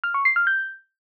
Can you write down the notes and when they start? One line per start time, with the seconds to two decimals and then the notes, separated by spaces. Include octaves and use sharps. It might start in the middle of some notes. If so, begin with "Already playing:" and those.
0.04 F6
0.14 C#6
0.25 C7
0.36 F6
0.47 G6